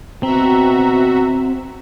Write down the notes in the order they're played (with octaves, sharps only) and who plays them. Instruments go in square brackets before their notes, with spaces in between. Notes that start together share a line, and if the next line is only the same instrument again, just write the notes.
[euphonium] B2 [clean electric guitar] C4 [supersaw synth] F#4 E5 [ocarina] A#5